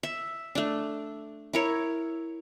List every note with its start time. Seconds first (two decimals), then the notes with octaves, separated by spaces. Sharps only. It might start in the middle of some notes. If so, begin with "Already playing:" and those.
0.03 E5
0.55 A3 D4
1.53 E4 A#4 C#5